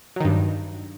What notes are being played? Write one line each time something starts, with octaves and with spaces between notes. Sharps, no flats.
G2 D#3 F#3